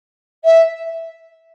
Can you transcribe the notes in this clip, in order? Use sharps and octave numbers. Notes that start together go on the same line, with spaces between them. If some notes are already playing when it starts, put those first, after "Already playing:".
E5